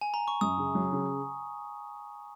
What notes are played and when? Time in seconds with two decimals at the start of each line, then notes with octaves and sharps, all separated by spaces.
0.01 G#5
0.14 A#5
0.28 C#6
0.41 F#2 D#6
0.58 C#3
0.75 F#3
0.92 C#3